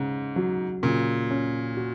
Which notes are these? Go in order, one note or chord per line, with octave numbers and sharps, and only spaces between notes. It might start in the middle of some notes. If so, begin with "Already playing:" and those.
Already playing: G#2 C#3
F#3
A#2 C#3
C#4
F#4